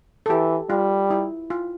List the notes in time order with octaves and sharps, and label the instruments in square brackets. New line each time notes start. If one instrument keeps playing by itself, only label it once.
[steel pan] A4
[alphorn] E3 [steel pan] G4
[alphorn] G3 [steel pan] F4
[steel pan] E4
F4